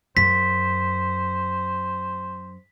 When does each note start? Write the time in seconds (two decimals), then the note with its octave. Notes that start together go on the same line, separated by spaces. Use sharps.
0.17 F#2 C5 B6